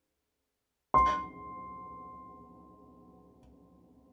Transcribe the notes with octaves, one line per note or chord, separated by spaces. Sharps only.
C6